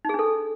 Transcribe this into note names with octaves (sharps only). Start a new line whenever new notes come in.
D4 D#4 G#4 A4